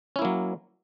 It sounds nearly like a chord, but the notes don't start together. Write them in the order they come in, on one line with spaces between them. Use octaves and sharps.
C#4 E4 A#3 F#3